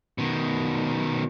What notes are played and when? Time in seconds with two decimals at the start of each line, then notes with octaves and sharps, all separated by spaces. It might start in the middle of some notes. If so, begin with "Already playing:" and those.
0.18 B2 D#3